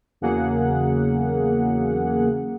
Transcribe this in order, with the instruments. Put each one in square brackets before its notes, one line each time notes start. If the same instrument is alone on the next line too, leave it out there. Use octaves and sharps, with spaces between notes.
[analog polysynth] E2 C#3 F#3 A#3 G#4 F#5